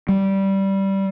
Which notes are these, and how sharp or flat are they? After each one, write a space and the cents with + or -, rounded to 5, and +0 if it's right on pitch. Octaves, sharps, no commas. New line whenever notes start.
G3 -10